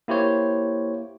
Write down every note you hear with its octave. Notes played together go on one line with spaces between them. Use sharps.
A#3 E4 G4 C5 C#5